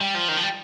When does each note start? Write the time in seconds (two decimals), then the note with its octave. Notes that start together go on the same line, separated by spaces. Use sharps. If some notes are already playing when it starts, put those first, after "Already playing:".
0.01 G3
0.15 F3
0.28 D#3
0.37 F3
0.43 G3